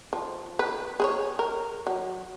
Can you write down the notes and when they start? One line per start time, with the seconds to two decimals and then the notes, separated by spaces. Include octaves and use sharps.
0.13 F3
0.59 B4
1.00 G#4 C5 C#5
1.39 A#4
1.87 F#3